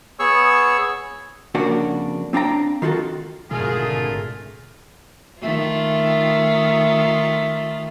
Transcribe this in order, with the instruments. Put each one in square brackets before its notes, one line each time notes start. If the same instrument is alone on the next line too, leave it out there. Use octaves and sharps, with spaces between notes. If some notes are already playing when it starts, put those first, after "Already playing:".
[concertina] B3 G#4 C#5 C#6 E6
[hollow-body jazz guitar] F2 C#3 A#3 D4 F#4
C4 D4 F5 G5 A#5
D#3 F4 F#4 A4
[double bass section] G#1 D3 [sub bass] B2 [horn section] A3 F4 A#4 [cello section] G#4
[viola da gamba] D#3 A3 F4